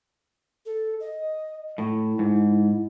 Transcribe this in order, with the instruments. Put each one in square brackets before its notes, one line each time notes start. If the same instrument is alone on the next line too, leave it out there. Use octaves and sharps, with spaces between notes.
[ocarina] A4
D#5
[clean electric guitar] A2 [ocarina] E4
[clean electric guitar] G#2